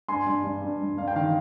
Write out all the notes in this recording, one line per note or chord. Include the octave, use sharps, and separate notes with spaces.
G2 G#5 C6
G2
G2
G2
G2
G2 F5
G5
D#3 F5